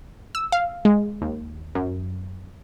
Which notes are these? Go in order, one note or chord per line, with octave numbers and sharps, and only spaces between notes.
E6
F5
G#3
D#2
F#2